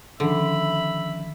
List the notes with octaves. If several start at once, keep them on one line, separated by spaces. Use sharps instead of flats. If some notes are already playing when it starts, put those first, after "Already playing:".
D3 D#3 F3 C#4 E5 B5